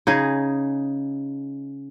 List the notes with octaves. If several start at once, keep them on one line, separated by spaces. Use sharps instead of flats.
C#3 D#4 G#4